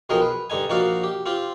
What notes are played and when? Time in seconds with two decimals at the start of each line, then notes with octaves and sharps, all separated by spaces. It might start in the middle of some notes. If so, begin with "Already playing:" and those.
0.09 B1 F3 G#4 A#4 D#5 G5
0.22 B4
0.50 G2 D3 D#4 G#5
0.69 A#1 D#4 F#4 D5 F5
1.04 G4
1.26 C4 F4 G4